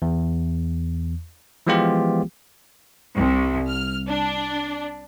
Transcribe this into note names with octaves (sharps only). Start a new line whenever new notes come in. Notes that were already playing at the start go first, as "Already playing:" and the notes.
E2
E3 F3 G#3 B3 F4 G4
C2
F6
D4